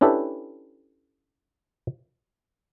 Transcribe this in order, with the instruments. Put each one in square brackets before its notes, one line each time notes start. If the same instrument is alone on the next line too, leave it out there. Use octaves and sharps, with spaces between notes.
[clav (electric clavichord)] C#4 D4 E4 G4 A4 B4